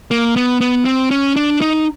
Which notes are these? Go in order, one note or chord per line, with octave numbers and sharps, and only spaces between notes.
A#3
B3
B3
C4
C#4
D4
D#4